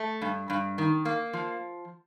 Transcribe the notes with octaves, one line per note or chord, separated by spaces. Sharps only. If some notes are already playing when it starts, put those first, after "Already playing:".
Already playing: A3
G2
G2
D#3
A#3
F3